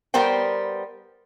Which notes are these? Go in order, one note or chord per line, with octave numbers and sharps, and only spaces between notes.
G3 B3 A#4 C5 G5